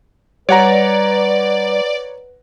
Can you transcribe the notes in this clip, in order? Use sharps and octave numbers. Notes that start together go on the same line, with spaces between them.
G3 B4 C#5 D5 F#5 A#5